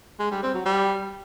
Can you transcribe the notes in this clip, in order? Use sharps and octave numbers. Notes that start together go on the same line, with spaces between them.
G#3
G3
C4
F#3
G3